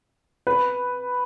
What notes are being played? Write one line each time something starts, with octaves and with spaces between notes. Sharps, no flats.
B4